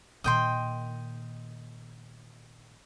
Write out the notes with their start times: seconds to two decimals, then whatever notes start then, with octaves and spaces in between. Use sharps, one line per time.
0.24 A#2 D#3 D#5 G5 C6